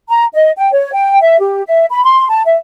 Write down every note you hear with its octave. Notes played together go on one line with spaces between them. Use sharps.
A#5
D#5
G5
C#5
G5
E5
G4
E5
B5
C6
A5
E5